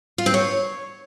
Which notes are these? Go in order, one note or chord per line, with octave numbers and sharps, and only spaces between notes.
F4
C4
C#5